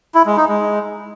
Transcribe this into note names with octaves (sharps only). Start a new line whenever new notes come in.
E4
G#3
D#4
G#3